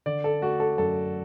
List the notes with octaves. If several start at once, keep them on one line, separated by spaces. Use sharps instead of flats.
D3 D5
A4
A3 F#4
A4
F#2 A4